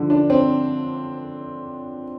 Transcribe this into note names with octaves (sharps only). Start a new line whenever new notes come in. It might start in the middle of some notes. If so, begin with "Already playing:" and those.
Already playing: D3 F3
D4
C4